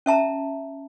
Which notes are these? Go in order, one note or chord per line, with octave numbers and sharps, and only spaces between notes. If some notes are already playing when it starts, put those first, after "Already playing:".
C#4 E5 A5 A#5